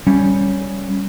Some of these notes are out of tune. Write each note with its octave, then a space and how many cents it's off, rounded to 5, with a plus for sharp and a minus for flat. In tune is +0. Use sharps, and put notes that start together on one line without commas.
G3 +0 C#4 +0